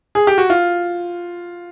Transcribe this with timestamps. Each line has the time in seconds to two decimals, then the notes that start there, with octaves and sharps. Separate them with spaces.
0.15 G#4
0.27 G4
0.38 F#4
0.50 F4